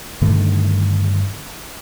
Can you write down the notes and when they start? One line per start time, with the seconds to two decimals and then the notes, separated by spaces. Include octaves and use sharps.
0.21 G2 D3 D#3 A3